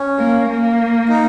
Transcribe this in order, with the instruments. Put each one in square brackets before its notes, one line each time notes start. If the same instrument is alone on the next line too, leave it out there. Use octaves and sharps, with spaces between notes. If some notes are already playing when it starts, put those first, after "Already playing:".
Already playing: [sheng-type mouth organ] C#4
[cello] A#3
A#3
[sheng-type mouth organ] D#4